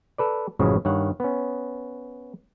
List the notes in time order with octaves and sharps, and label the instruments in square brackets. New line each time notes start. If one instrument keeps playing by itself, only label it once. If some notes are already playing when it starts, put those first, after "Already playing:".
[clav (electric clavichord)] A4 B4 D5
A1 F#2 A2 C#3 F3 G#3
G2 D#3 C#5 F#5
B3 C#4